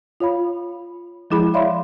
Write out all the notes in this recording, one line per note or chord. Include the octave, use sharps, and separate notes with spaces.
F4 C#5 F5 B5
F3 G#3 E4 G#4 B5
C#5 D5 E5 F5 B5 C6